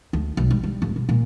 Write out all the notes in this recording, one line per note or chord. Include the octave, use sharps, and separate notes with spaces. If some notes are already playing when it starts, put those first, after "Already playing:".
D2
B1
G3
G3
D1
B2
A#2